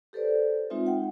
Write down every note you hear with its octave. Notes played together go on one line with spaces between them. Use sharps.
G4 A4 B4 C5 D5
G#3 C4 D#4 F4 E5
F#5 G5